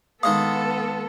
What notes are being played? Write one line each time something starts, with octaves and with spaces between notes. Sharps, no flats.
D#3 G#3 B3 A4 F5 D#6